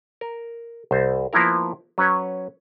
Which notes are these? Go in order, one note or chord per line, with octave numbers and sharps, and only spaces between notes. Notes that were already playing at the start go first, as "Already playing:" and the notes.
A#4
C2 C5
F3 A#3 B3 E4 A#4
F#3 C#4 B4 C#5